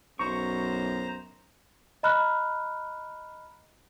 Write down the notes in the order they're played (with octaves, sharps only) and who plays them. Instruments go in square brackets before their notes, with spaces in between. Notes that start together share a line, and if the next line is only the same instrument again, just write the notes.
[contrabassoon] B1 [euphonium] F#2 [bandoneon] C5 A#5 [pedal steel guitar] C#6
[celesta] D#5 A#5 B5 F6 F#6